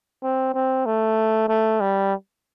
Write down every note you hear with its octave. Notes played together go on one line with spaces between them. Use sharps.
C4
C4
A3
A3
G3